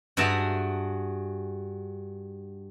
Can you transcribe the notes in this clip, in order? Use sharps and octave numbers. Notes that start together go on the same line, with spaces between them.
G2 F#4 G#4 E5 A5 A#5